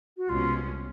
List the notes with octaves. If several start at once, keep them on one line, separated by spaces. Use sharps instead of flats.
F#4
C2 B2 G#3 C#4 F4